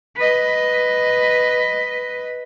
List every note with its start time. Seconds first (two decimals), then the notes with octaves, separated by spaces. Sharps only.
0.16 B4 D#5